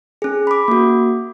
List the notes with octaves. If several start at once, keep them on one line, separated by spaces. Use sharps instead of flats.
C#4 G#4
B5 D6
A#3 F#4